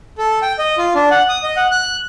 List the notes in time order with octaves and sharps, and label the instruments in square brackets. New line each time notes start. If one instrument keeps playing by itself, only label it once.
[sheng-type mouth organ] A4
G5
D#5
F4
D4
F#5
D#6
D#5
F#5
F#6